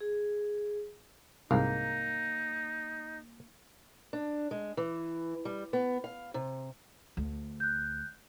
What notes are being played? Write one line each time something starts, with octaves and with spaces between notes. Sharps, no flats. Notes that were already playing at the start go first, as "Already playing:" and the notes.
G#4
C2 G#2 A#3 D#4
D4
G#3
E3
G3
B3
F5
C3
D2
F#6 G6